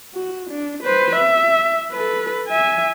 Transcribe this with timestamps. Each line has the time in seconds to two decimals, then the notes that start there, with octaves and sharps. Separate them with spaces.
0.14 F#4
0.50 D4
0.83 B4 C5
1.16 E5
1.92 A4 B4
2.47 E5 G#5